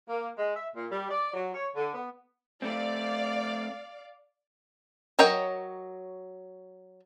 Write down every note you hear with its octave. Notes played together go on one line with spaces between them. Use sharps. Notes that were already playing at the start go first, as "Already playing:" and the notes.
A#3
G#3
E5
A#2
G3
D5
F#3
C#5
D3
B3
A3 C4 D5 F5
F#3 A#4 C#5 D#5 G5